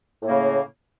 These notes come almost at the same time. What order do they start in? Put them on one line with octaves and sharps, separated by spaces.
A2 A#3 C#3